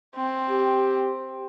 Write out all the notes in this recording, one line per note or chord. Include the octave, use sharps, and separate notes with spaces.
C4
G4